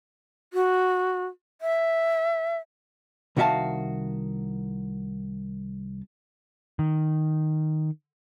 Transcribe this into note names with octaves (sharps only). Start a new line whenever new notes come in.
F#4
E5
C2 D#3 F#4 E5 F5 A5
D#3